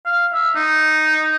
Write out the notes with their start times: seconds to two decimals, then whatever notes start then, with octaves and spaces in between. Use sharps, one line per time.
0.06 F5
0.33 E5
0.55 D#4